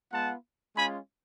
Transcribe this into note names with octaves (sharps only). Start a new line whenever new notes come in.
G#3 B3 F4 F#5 A5
G#3 C#4 F4 G#5 B5